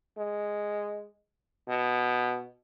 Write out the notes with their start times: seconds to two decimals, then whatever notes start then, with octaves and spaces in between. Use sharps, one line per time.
0.17 G#3
1.68 B2